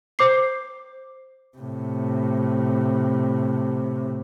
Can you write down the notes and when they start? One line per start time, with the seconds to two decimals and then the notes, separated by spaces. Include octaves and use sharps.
0.19 C5 D6 C7
1.58 A2 C3